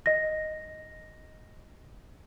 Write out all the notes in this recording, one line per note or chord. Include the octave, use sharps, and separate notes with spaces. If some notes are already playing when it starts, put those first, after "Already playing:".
D#5 A#6